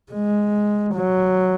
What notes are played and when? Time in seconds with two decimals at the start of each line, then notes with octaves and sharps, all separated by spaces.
0.12 G#3
0.95 F#3